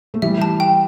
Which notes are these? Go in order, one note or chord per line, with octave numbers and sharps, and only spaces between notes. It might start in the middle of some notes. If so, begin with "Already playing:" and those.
A3
E3 G3 E5
A5
G5